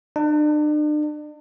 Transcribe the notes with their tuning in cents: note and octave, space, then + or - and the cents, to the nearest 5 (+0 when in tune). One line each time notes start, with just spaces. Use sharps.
D4 +40